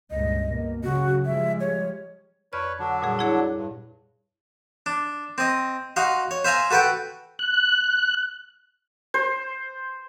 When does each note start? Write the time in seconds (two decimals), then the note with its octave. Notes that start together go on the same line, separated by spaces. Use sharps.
0.11 C#2 G2 A#2 D#5
0.45 B2 A#3
0.84 C#3 F#3 F#4
1.26 F3 G3 G#3 E5
1.60 C#5
2.53 F2 B4 C#5 D5 F6
2.80 D3 F#3 D4
3.02 A#2 G3 G#4
3.19 E4 G#4 C#5
3.56 G2
4.86 D4
5.38 C4 D#5
5.96 D#4 F#4 F5 C6
6.31 C#5
6.44 C5 E5 F5 G#5 A#5
6.71 F#4 A4 B4 F#5 G5
7.39 F#6
9.14 C5